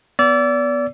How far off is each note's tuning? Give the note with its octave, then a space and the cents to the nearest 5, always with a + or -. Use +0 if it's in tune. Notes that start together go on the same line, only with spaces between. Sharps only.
B3 +0 D5 -30 E6 +20